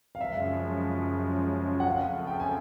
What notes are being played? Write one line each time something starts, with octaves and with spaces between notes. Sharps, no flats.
F5
F#2 C#3 F3 G#3 E5
F#5
F2 C#3 F3 A3 F5
G5
G#5